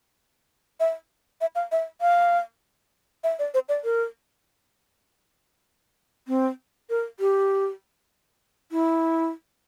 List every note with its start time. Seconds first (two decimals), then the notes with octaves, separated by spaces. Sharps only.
0.80 E5
1.41 E5
1.55 F5
1.72 E5
2.01 F5
3.24 E5
3.39 D5
3.54 C5
3.69 D5
3.84 A#4
6.28 C4
6.90 A#4
7.20 G4
8.72 E4